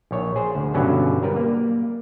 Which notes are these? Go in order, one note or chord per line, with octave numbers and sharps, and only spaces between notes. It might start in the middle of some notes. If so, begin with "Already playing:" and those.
A#1 C#5
G#4 C5
D2
G2 B2 D3 F#3 C#4
G3 A#4 B4
A#3